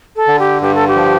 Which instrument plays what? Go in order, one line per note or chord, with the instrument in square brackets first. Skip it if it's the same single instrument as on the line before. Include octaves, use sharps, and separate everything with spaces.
[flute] A4
[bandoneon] D3
[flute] G4
[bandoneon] G2 [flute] G4
[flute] A4
G4
[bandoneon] F3